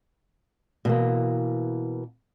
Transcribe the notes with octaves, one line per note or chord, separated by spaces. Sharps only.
B2 E3 A#3